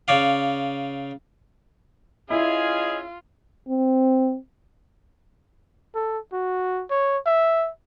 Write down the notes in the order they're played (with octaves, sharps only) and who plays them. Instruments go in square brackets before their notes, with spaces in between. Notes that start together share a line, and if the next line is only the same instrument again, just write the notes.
[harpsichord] C#3 C#5 D5 F5
[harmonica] C#4 G#4 [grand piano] E4 [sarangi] F4 [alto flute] D#5
[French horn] C4
[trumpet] A4
F#4
C#5
E5